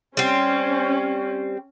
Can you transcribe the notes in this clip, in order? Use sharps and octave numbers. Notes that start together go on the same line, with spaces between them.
G3 C4 C#4